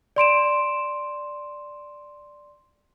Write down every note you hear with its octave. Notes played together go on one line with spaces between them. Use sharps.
D5 C6 D7 E7